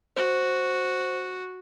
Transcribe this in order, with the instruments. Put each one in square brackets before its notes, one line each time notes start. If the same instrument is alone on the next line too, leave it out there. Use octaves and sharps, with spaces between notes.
[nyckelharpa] F#4 [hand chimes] C5